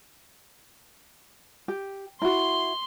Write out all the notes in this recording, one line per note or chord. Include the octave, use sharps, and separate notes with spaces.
G4
E4 F#4 C6